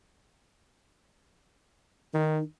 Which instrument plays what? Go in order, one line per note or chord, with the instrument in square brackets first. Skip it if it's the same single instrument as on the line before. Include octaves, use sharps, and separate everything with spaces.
[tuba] D#3 [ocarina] D#4